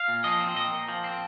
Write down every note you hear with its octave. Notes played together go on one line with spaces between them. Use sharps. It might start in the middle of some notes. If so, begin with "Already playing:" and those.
Already playing: F5
A#2
F3 D#5
C4
A#2 D#5
A#2
F3
C4